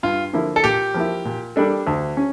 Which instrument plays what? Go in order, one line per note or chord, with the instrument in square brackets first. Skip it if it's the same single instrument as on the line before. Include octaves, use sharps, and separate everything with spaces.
[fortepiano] G2 [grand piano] F4
[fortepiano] D3 F3 A#3 E4
[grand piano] A4
[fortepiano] A#2 [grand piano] G4
[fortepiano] F3 A#3 E4
A#2
G3 A#3 D4 A4
D2
C#4